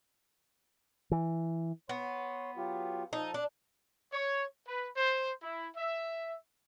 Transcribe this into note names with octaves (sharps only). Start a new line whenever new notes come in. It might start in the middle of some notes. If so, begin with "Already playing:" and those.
E3
B3 C#5 C6
F#3 F4 G4
F3 D#4 A4
D4
C#5
B4
C5
E4
E5